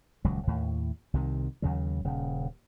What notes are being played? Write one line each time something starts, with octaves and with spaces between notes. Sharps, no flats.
D#1 C#2 F#3
D#2 A2
C2 C3 D#3
D#2 C#3 F#3
D#1 C#3